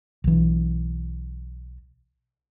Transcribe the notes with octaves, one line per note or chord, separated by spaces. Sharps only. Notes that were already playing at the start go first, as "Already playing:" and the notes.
B1 E3